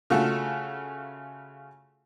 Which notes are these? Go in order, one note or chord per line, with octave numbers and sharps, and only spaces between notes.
C#3 A3 F4 F#4 A4